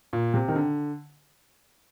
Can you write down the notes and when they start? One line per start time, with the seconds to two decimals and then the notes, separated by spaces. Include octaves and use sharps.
0.13 A#2
0.34 C3
0.48 D#3
0.56 D3